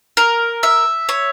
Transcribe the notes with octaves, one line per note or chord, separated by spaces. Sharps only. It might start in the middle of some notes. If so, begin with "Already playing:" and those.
A#4
E5
C#5